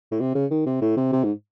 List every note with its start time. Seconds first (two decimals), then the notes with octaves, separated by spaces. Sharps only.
0.11 A2
0.20 C3
0.35 C#3
0.51 D#3
0.66 C3
0.81 A2
0.97 C3
1.12 C3
1.24 G#2